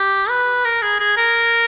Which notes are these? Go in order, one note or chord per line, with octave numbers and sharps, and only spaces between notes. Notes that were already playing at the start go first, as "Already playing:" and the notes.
Already playing: G4
B4
A#4
G#4
G#4
A#4